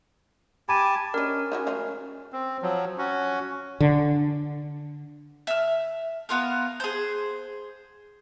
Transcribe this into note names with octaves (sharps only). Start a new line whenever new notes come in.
G4 G#5 A5 B5 D#7
C#4 D4 A#4 D#5
D#4 E4 F#4
F3 G#3 A3
C4
F3 F#3
C#4 F#4
D3
E5 F6
B3 F4 A#4
G#4 C5